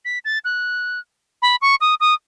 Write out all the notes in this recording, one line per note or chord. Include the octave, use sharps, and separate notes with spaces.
B6
A6
F#6
B5
C#6
D#6
D#6